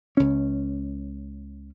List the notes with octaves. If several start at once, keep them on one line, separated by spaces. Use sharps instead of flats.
C#2 C#4